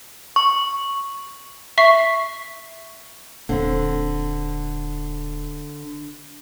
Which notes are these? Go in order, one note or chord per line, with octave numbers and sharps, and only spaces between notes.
C#6
E5 C#6 B6 C7
D#1 D3 C4